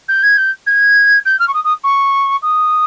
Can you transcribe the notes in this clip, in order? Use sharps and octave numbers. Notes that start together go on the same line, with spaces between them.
G6
G#6
G6
G#6
G6
F6
C#6
D#6
D#6
C#6
D#6